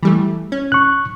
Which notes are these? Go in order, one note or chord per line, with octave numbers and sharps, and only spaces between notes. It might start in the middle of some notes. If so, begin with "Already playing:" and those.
E3 G3 A3
C#4
C#6 F#6